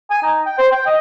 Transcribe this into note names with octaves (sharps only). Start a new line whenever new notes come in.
G#5
D#4
G5
C5
G5
D#5